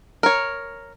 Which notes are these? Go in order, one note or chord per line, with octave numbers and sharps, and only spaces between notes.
A#4 C#5